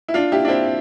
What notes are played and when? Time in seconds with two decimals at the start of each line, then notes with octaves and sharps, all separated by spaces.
0.08 E4
0.14 D4 F4
0.32 E4 G4
0.45 D4
0.48 C4 E4